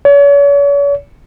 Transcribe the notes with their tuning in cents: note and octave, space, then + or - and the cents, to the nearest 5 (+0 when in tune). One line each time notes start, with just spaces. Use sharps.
C#5 +40